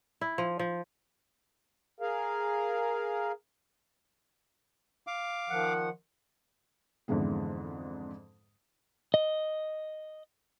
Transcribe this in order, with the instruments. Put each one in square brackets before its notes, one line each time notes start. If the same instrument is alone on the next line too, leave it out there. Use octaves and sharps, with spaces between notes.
[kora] E4
F3
F3
[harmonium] G#4 A#4 F5
[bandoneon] F5 D6
[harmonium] D#3 F3 F#5
[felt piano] F2 G#2 D3 E3 G#3 B3
[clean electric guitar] D#5